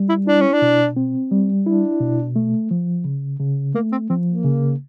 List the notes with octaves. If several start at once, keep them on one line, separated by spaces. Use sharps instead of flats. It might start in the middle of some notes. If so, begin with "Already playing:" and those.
Already playing: G3
E4
D4 E4
C#4
D4
B2
C4
G3
D4 E4
B2
A3
F3
C#3
C#3
A3 A#3
C4
F3 C4
A#3
C#3